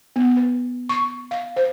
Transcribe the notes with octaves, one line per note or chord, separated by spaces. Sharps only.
B3
B4
C#6
F5
C5